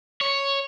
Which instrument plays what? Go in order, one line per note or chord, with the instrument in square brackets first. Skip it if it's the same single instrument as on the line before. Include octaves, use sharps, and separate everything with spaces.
[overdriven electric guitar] C#5